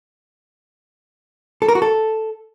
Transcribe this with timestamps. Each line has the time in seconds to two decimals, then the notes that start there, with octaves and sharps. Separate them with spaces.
1.62 A4
1.68 A#4
1.75 F#4
1.82 A4